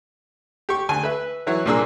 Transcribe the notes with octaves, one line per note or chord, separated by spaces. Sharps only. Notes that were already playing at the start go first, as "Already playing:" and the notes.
G4 C#6
D2 G#5
B4 E5
E3 F#3 E4 C#5
C2 A#2 A#3 D4 G#4 E6